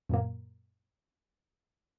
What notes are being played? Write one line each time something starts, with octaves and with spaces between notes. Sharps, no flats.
F#2 A#2 A#3